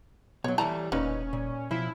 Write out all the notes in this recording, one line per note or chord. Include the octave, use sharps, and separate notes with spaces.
B1 F#3 B3 C#5
E3 G3 A3 E4 A5 A#5
E1 A#2 A#3 C#4 D#4 B4
A#2
B2 F3 E4